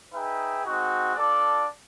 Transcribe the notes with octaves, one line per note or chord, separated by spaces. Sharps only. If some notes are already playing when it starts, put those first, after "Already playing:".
D#4 G#4 B4 E5 G5
G#3 C4 D#4 F#4
D4 F4 A4 D5